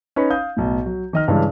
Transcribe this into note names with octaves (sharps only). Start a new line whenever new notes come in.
C#4 D#4 B4 C#5 B5
F5 D#6 G6
B1 A2
F#3
D#3 D#5 F6
G2 C#3 E3 G#3 C#4 D4